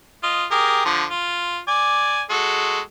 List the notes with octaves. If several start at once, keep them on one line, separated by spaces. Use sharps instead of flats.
F4 D#5
G4 G#4 A#4
D3 F3
F4
D5 G#5
G#3 F#4 A4